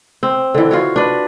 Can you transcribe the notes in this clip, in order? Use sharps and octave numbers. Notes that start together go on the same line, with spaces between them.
C4
D3 E3
F4 F#4 C#5
D4 B4